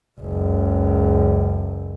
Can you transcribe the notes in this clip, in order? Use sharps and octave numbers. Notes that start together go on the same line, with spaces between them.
F#1 C#2